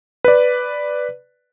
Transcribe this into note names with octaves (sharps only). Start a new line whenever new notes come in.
B4 D5